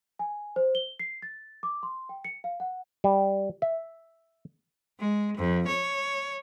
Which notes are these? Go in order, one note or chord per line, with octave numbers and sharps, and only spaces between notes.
G#5
C5
G7
C7
A6
D6
C6
G5
C#7
F5
F#5
G3
E5
G#3
F2
C#5